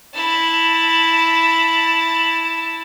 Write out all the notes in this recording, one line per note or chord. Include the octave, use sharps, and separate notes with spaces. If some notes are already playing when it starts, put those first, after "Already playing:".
E4 A5